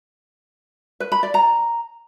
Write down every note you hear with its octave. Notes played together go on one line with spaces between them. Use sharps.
B4
B5
D5
A#5